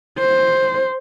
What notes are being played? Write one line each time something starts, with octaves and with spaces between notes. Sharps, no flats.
C5